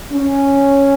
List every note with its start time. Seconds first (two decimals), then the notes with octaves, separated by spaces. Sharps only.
0.13 C#4